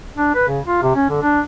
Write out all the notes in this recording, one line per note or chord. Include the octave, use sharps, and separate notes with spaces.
D4
B4
C#3
F4
C3
C#4
D3
D4